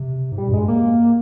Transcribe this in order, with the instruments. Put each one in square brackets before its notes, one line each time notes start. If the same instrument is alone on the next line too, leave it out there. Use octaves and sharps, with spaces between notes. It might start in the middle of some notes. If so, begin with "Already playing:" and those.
Already playing: [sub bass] C3
G#2
[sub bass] A#2 [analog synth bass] G3
[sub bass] G2
[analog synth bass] G#3
[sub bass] G2
[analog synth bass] A#3